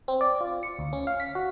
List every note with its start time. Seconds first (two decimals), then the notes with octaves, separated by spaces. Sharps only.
0.08 C4
0.21 D5
0.41 F4
0.63 C#7
0.79 D2
0.93 C#4
1.07 F5
1.20 B6
1.35 F#4